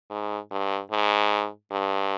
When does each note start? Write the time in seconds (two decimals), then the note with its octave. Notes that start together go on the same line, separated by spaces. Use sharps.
0.10 G#2
0.51 G2
0.91 G#2
1.72 G2